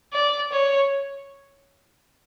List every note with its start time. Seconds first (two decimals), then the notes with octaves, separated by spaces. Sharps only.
0.13 D5
0.51 C#5